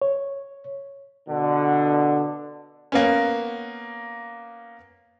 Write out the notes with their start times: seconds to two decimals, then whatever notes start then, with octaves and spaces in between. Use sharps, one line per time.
0.02 C#5
1.28 B2 D3
2.92 A#3 B3 C#4